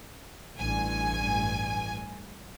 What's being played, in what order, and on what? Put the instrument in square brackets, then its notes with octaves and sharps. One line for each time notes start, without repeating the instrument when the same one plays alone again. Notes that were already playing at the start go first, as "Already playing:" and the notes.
[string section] A1 G2 G#5